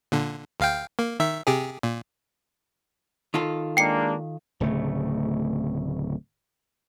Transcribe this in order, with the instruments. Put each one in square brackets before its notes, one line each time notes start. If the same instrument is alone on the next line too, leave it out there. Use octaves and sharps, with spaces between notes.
[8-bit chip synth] A#2 D3
D2 F5 G5
A#3
D#3 E5
C3 G4 G#4
A#2
[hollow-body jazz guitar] D#3 F4 A4
[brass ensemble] G#3 A#3 D4 [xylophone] G5 C#7
[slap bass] D1 C#3 A3